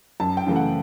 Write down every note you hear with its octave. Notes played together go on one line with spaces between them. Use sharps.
F#2 A5
G5
C#3 E3 A3
F#5